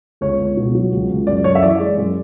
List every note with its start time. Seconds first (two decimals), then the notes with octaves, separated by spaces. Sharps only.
0.21 C#2 C#5
0.39 C#2
0.57 B2
0.75 F#3
0.92 C#2
1.09 C#2
1.27 F#2 D5
1.44 F#2 C#5
1.55 E5
1.63 E3 D5
1.80 G#3
1.98 F#2